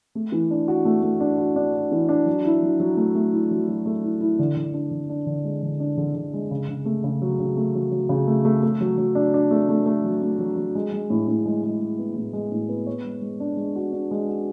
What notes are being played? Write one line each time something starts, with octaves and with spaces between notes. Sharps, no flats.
A3
E3
D4
F#4
A3
A3
D4
F#4
D4
F#4
E3
D4
F#3
E4
F#3
F#3
A3
A3
E4
F#3
F#3
A3
E4
E4
D3
D3
D4
D3
D4
D3
G#3
D3
D4
D3
D3
G#3
C#3
C#3
A3
C#3
F#3
C#3
A3
F#3
F#3
C#3
A3
A3
A3
F#3
F#3
D4
D4
A3
A3
A3
F#3
A3
F#3
F#3
G#3
G#3
A2
A2
G#3
G#3
G#3
B3
A2
G#3
A2
B3
C#5
G#3
G#3
D4
G#3
F#4
D4
G#3
F#4